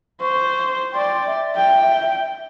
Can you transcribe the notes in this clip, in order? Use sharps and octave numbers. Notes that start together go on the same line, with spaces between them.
C5 C#6
D5 G5 C6
E5
G5